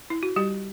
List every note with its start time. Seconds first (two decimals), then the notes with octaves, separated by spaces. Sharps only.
0.10 E4
0.23 F#4
0.36 G3 G4